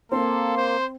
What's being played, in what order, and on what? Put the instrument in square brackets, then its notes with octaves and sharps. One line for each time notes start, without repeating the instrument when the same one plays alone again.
[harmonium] A#3 [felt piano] C4 [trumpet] A4 [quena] C6
[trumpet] C5